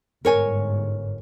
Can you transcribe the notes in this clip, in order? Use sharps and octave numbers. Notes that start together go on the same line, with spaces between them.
G1 G#2 A#4 C#5 G#5